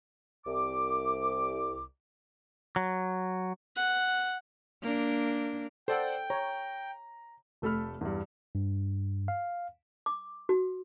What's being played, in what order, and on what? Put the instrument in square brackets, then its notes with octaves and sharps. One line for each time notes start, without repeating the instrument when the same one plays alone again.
[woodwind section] C2 D6
[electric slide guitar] F#3
[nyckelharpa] F#5
[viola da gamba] A#3 D4
[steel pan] A4 [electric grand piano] C5 D5 F#5 [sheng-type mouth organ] G5
[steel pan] C#5 [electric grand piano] A#5
[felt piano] F1 A3 A4 B5 F6
E2 G2
[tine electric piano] G2
F5
[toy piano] D6
F#4